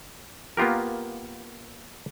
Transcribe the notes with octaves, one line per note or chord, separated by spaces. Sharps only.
A#3 B3 F4 G4 A#4